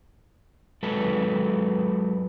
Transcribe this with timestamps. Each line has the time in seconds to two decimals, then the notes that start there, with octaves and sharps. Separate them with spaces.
0.83 F#3 G#3 A4 B4